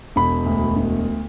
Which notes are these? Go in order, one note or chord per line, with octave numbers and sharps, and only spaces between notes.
E1 B5
D2
E1